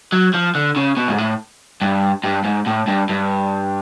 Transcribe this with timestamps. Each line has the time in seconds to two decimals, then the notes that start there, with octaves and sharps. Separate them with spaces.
0.12 F#3
0.34 F3
0.55 D3
0.76 C#3
0.97 B2
1.08 G#2
1.18 A2
1.81 G2
2.24 G2
2.45 G#2
2.67 A2
2.88 G2
3.10 G2